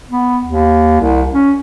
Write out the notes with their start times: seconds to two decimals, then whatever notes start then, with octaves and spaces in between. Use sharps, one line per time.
0.11 B3
0.45 D#2
1.01 C2
1.34 C#4